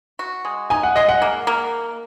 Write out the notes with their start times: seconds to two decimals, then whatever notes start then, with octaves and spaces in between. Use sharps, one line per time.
0.19 F#4
0.45 G#3
0.70 D#4 G#5
0.83 F#5
0.96 G#3 D#5
1.09 F#5
1.22 A#3
1.47 A#3